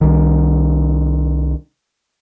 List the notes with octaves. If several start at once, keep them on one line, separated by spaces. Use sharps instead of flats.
C2 D#3